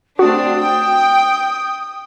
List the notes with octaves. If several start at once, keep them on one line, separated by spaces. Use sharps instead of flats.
A3 C4 D4 F#4 D#6
G5